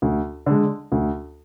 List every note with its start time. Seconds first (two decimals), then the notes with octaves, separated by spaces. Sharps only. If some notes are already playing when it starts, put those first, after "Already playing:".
0.02 D2
0.46 D3 G#3
0.92 D2